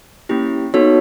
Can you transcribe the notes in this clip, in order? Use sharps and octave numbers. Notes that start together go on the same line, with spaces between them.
A#3 C#4 E4 G4
B3 D#4 F#4 A4 C#5